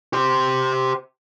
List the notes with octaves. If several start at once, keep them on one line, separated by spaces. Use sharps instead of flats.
G4 C5